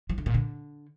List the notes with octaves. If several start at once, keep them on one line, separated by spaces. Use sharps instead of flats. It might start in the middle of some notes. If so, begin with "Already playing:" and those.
F3
D3
A#2
D3